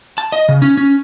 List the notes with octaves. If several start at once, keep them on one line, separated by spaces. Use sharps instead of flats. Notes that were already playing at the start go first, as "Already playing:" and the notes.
A5
D#5
C#3
C#4
C#4